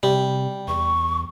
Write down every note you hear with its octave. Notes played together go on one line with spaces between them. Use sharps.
C3 G3
E2 C#6